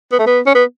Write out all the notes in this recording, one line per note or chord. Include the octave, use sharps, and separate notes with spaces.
B3
A3
B3
C#4
B3